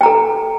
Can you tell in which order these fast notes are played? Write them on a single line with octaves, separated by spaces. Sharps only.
G5 A#5 A4